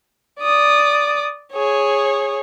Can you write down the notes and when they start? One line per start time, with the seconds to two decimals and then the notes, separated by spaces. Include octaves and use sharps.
0.40 D5 D#6
1.53 G#4 C#5